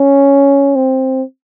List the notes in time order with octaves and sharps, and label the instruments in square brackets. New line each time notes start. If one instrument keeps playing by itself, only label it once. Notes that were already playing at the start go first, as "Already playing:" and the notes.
Already playing: [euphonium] C#4
C4